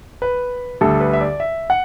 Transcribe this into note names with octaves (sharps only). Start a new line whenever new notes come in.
B4
D2 D3 G3 A4
B4
E5
D5
E5
F#5